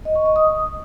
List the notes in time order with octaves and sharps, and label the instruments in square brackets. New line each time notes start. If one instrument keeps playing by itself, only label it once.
[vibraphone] D#5
C#6
D#5
D#6